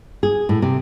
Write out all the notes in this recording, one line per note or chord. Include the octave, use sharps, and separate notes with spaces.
G#4
A2
C3